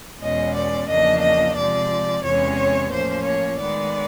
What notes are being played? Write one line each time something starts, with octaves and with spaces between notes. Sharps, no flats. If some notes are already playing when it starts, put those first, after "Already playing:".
E2 B2 G#3 C#4 D#5
D5
E2 C#3 F3 A#3 D4 D#5
D#5
C3 F3 G#3 D5
E2 C3 E3 G#3 C#4 C#5
A2 F3 A#3 C#4 C5
C#5
D#3 G#3 B3 D5